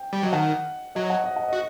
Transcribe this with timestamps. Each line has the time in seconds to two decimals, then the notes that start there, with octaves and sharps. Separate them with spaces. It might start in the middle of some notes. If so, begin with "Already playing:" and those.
Already playing: G5
0.13 G3
0.23 F#3 D#5
0.33 D#3 F#5
0.95 F#3 D#5
1.10 F#5
1.24 D#5
1.36 F#5
1.48 F#4 D#5